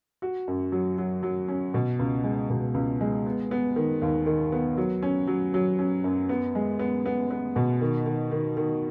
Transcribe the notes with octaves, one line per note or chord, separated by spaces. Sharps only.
F#4
F#2
F#3
F#3
F#3
C#4
B2
C#2
G#3
B2
C#2
G#3
B3
B3
D#3
D#2
D#3
B3
F#3
C#4
F#3
F#3
C#4
F#2
B3
G#3
B3
B3
B3
B2
D#3
D#3
D#3
D#3